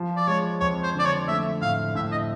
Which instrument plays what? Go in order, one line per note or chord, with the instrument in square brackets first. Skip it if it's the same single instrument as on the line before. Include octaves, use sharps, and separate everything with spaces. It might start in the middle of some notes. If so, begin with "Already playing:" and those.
Already playing: [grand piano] F3
[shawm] D5
[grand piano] G#3 [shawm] C#5
[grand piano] F2 [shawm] C#5
[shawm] C5
[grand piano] D3
[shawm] D5
C#5
[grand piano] A3 [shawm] E5
[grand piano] A2 [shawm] F5
[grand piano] A2 [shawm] E5
[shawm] D#5